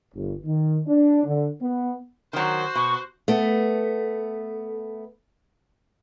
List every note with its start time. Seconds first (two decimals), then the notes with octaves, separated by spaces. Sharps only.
0.14 G1
0.45 D#3
0.87 D4
1.24 D3
1.61 B3
2.33 D#3 F#3 F#4 C5
2.76 B2 C#6
3.28 A3 B3